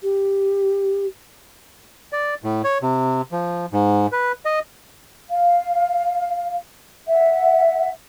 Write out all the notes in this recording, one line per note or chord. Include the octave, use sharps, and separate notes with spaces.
G4
D5
A2
C#5
C3
F3
G#2
B4
D#5
F5
E5 F#5